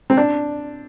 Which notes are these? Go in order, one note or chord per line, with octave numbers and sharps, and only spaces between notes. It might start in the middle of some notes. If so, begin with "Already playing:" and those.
C4
D4